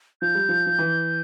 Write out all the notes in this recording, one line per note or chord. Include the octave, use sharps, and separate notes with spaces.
F3 G6
G3
F3
F3
E3